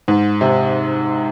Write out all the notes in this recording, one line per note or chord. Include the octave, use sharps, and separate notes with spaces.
G#2
C3